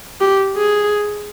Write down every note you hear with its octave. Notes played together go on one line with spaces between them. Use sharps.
G4
G#4